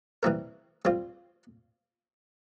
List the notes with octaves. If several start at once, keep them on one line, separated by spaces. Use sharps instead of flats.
E3 G3 C4 E4 A#4
G3 C4 F4 C5